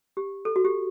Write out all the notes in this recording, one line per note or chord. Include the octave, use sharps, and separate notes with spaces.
G4
A4
F#4
G4